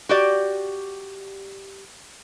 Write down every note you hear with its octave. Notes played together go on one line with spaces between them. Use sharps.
F#4 G4 D5